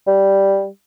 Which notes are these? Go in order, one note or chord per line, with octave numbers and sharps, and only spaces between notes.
G3